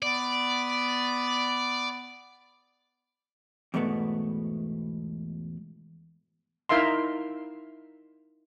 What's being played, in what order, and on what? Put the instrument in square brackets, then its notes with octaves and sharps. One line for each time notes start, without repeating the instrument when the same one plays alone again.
[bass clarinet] B3 [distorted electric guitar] D5
[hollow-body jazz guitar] E2 G#2 B2 A3 B3
[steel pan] D#4 E4 A#4 E5 F5 C6